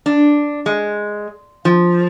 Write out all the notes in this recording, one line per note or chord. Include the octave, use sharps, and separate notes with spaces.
D4
G#3
F3